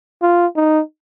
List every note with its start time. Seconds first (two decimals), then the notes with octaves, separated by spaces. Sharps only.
0.22 F4
0.56 D#4